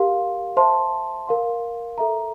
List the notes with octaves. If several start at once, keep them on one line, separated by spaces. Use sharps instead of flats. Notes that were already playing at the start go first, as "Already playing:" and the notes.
Already playing: G4 A#4 F5 C6
C5 E5 A5 C6
A#4 F5 C6
A4 E5 A#5